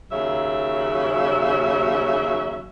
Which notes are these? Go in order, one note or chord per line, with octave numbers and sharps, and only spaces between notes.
D#2 C#3 F#3 E5